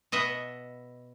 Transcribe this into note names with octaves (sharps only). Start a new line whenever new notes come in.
B2 D#5 E5 F#5